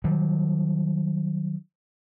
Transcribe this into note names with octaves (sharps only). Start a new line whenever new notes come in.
D#3 F#3 G3